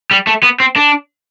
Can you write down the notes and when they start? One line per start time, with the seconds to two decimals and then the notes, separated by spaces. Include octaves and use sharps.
0.11 G3
0.27 A3
0.43 B3
0.60 C4
0.76 D4